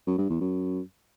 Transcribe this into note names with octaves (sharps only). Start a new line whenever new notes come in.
F#2
G2
E2
F#2